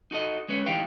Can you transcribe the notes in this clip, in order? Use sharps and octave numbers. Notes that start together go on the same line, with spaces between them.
D#4 F#4 A4 D#5
G#3 C#4 B4 C#5
A2 E3 D#4 G4 F5 G5